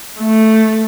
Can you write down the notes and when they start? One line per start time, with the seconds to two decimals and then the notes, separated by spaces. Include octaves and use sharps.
0.20 A3